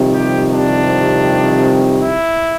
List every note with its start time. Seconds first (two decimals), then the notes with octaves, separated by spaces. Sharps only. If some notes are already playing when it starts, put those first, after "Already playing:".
Already playing: F2 C3 D#3 G3
0.14 G4
0.52 D4
2.03 E4